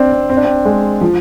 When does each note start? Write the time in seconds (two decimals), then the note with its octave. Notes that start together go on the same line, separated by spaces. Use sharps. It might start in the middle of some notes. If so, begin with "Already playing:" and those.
Already playing: C4 D4
0.12 C4
0.30 C4
0.37 D4
0.45 C4
0.65 G#3
1.01 F3